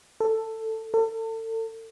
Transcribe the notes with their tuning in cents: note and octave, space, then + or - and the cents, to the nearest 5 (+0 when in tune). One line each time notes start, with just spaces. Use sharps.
A4 +10
A4 +35